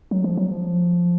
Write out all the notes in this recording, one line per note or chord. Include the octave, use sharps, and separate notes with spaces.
F#3
F3
F#3
F3